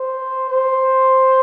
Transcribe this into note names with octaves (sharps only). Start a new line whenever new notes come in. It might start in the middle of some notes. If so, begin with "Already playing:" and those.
Already playing: C5
C5